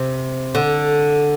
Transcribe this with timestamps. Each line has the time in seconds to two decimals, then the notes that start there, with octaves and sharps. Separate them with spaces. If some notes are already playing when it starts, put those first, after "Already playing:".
Already playing: C3
0.55 D3